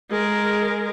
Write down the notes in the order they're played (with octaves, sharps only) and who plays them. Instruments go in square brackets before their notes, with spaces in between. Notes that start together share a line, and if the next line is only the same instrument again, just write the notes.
[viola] G#3 A#4